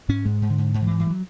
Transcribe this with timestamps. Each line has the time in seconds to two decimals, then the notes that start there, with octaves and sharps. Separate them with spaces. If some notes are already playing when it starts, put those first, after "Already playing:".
0.09 G#2 C#4
0.25 G#2 G#3
0.42 G#2
0.50 D3
0.58 G#2
0.74 G#2
0.81 D#3
0.87 E3
0.91 G#2
0.99 E3
1.06 G3
1.10 F#3